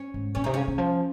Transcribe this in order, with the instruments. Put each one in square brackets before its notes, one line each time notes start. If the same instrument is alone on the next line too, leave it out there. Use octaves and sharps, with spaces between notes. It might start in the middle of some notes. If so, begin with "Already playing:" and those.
Already playing: [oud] C#4
[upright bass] G#2
[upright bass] A#2 [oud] C#4
[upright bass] C3 [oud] D#4
[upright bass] C#3 [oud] C#4
[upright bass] D#3
F3